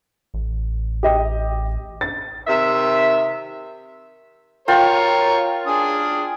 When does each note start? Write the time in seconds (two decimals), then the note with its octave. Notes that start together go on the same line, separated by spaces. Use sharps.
0.34 A1
1.03 G4 D#5
2.01 A6
2.48 C3 D#3 E5
4.68 F4 A#4 C#5 G5
5.67 D4 G#5 D#6